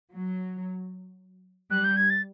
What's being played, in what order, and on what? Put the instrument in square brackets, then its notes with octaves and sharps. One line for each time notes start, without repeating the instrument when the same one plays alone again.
[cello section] F#3
[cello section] G3 [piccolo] F#6
[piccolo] G6
G#6
A6